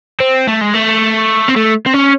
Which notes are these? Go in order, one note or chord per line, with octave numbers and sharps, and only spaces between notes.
C4
A3
G#3
A3
C4
A3
C4
C#4